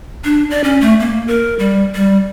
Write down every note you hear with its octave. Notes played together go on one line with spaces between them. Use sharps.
D4
D5
C#4
A3
A#3
A#4
G3
G3